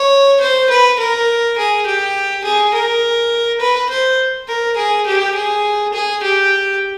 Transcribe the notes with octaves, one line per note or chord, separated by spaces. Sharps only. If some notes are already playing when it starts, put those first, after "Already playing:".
Already playing: C#5
C5
B4
A#4
G#4
G4
G#4
A#4
B4
C5
A#4
G#4
G4
G#4
G#4
G4